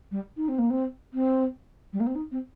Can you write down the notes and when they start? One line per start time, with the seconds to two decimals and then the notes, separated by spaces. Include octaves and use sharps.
0.11 G3
0.37 D#4
0.48 C4
0.58 A#3
0.70 C4
1.13 C4
1.93 G3
2.00 A#3
2.07 C4
2.15 D#4
2.31 C4